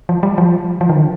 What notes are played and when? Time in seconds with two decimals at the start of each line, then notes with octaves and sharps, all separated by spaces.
0.09 F3
0.23 G3
0.38 F3
0.81 F3
0.89 D#3
0.96 D3